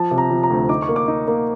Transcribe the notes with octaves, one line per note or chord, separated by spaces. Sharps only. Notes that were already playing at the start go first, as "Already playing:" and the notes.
Already playing: F3 A5
C3
A#5
F3
A#5
D2
D#4 D6
C#6
A#3
D6
D#4
A#3